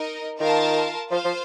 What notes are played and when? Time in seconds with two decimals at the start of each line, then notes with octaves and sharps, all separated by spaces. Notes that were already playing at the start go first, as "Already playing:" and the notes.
Already playing: D#4 A#4 D#5
0.40 D#3 F4 A#4 F5 A5
1.11 F3 F4 C5 F5
1.25 F3